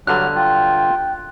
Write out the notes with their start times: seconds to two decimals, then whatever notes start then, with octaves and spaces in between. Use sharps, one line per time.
0.07 G2 D3 F#3 F6 F#6
0.36 F4 G5